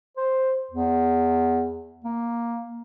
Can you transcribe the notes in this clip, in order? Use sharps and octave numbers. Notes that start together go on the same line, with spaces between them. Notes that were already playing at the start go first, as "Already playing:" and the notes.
C5
E2
A#3